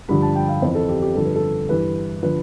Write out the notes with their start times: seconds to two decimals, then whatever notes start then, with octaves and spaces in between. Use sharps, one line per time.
0.09 G2 D3 F3 B5
0.22 A5
0.35 G5
0.49 F5
0.62 F2 E3 C5
0.75 A4
0.89 G4
1.02 G4
1.15 G2 D3 F3 A4
1.25 B4
1.36 A4
1.69 G2 E3 B4
2.23 D3 F3 B4